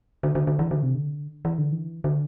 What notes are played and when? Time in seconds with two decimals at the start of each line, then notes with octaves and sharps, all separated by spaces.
0.23 D3
0.35 D3
0.47 D3
0.59 E3
0.71 D3
0.83 C3
0.95 D3
1.45 E3
1.59 D3
1.72 E3
2.04 D3